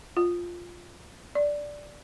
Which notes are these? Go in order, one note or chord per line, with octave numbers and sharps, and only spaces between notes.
F4
D5